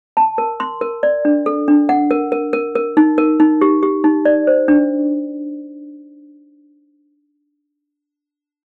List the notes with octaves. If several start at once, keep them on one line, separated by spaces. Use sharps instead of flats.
A5
A#4
C6
A#4
D5
D4
A4
D4
F#5
A#4
A#4
A#4
A#4
D#4
A#4
D#4
G4
G4
D#4
D5
C5
D4